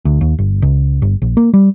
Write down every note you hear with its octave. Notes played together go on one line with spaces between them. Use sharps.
D2
D#2
G1
C#2
G1
A#1
A#3
G3